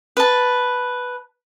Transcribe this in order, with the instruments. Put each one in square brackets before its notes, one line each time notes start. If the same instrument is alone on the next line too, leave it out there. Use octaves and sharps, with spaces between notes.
[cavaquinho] B4 A5